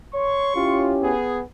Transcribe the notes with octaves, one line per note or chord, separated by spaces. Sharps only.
C#5 C6 C#6
C#4 E4 F4 G4
B3 G#4